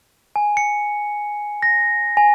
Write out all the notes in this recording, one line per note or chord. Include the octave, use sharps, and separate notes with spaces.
G#5
C#7
A#6
G#5